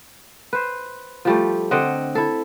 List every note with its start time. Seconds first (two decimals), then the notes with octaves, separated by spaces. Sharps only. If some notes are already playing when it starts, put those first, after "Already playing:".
0.53 B4 C5
1.25 F3 G3 A3
1.71 D3 C4 D#5 F#5
2.15 E4 A4